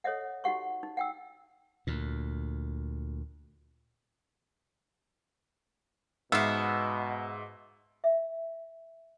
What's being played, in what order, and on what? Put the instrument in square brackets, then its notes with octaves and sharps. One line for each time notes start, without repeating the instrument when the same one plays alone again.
[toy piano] A4 C#5 D#5 E5 F#5
D#4 F#4 G4 F#5 C#6
D#4
F#5 G5 E6
[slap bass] D2 A#2
[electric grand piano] G#2 E6 [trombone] B2 [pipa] B3 [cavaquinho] E5 F5
[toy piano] E5